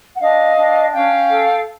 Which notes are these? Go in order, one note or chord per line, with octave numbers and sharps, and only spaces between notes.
F#5
D4 D#5 F5
D4
C#4 F5 G5
A4